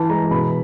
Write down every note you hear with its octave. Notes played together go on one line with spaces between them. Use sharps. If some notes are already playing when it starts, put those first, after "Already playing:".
Already playing: E3 A5
G#3 A#5
B2 B5